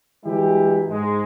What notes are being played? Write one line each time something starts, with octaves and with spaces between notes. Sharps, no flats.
G2 E3 F#3 G#3 E4 G4
G#2 G#3